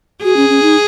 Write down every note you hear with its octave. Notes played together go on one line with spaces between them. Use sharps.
F#4 G#4
C#4
C#4
D#4